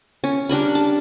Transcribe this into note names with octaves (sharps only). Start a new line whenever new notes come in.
C#4
G3 D4 A#4 B5
A5